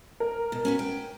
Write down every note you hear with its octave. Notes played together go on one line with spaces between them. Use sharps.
A#4
B2
C#4 F#4 B4
G5